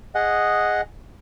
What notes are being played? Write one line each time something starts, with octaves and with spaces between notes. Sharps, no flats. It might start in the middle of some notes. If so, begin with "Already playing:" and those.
G#4 D#5 F#5